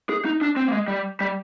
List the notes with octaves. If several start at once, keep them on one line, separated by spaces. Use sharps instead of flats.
G#4
D#4
D4
C4
A#3
G#3
G3
G3